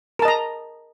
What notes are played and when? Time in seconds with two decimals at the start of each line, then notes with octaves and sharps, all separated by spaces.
0.19 A#4
0.22 A5
0.25 D#5
0.28 A#5